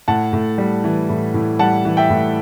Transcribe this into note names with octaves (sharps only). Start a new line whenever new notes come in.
A2 F#5 A5
A2
G3
E3
A2
A2
G3 F#5 A5
E3
E5 G5
A2